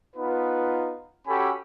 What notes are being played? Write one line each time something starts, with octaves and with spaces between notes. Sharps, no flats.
B3 D#4 F4 B4
C#4 F#4 G4 A4 G#5 B5